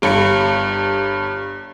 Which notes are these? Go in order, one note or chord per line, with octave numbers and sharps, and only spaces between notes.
G1 G2 B5 C#7